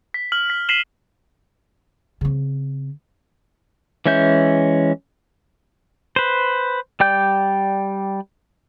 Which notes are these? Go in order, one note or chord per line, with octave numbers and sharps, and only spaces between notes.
B6
F6 F#7
B6
B6 C7 D#7 E7 F#7 G7
C#3 C4
E3 G#3 C#4 E5 G6
B4 C5
G3 D5 G5 G6